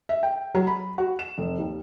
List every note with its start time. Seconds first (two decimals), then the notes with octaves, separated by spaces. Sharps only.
0.09 E5
0.23 G5
0.55 F#3
0.67 B5
0.98 F#4
1.19 E7
1.38 F1
1.58 D#2